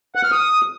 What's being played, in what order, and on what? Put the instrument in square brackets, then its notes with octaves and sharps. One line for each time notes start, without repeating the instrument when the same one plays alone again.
[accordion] F#5
F6
D#6